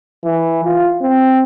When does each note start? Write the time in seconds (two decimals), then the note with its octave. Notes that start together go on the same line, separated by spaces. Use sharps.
0.24 E3
0.64 F4
1.02 C4